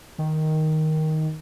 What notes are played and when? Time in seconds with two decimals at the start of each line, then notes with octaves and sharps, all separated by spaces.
0.18 D#3